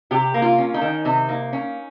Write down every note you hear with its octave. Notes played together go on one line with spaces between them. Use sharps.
C3 G4
A#3
F4
C#4
D#4
D#3
C3 D#4
A#3
C#4